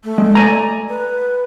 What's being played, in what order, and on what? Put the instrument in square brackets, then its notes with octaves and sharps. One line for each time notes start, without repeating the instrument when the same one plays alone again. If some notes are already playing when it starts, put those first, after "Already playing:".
[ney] A3
[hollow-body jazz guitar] G#3
D5 G#5 A#5
[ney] B4